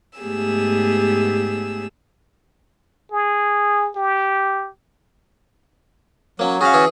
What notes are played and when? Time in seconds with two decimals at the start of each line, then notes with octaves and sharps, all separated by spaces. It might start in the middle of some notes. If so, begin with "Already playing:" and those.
0.19 G#2 A3 B3 G4 G#4 E6
3.12 G#4
3.96 G4
6.39 F#3 A#3 C#4
6.61 C#4 F#4 G#4 F5
6.74 E3 G#4